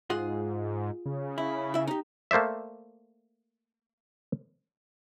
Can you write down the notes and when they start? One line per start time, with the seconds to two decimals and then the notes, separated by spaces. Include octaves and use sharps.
0.10 G#2 F4 G#4 F#5
1.06 C#3
1.38 E4
1.74 E4 E5
1.87 D#4 G4
2.31 A3 A#3 C5 D5 E5